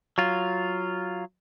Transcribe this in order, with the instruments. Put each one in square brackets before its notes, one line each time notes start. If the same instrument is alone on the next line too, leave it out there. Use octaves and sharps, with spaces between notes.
[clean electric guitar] F#3 F4